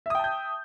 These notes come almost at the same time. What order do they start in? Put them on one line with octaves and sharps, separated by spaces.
E5 D#6 G5 A5 G6